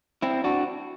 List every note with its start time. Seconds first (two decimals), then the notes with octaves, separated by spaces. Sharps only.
0.22 C4 E4
0.44 D4 F#4